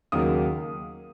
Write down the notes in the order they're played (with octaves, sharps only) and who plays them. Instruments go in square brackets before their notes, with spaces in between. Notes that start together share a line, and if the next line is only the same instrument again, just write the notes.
[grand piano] D#2 C#3 F#3 A#3 D#4 D#6